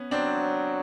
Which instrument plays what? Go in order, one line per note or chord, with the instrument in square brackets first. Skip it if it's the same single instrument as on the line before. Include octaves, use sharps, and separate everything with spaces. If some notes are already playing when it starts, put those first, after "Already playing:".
Already playing: [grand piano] B3 C#4
[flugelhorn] F#3 [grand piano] C4 D4